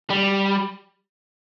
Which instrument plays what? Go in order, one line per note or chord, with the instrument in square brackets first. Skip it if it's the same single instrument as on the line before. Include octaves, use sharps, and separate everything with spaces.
[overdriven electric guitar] G3